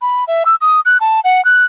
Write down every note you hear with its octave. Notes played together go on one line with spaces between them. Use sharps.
B5
E5
E6
D#6
F#6
A5
F#5
F#6